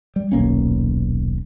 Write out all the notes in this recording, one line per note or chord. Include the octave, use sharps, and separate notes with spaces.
G3
D#1 B1 A#3 C#4